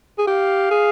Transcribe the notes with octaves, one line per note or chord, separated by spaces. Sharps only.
G#4
G4 F5
G#4